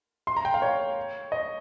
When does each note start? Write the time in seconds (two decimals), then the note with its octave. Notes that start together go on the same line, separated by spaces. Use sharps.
0.27 C6
0.36 A#5
0.45 G5
0.54 F5
0.62 C#5
1.32 D#5